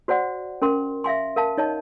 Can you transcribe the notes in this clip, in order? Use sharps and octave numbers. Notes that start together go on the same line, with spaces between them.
F#4 C5 D5 F#5
C#4 A#4 C6
E5 F5 G#5 C6
A#4 F5 A5
D#4 C#5 D#5 A5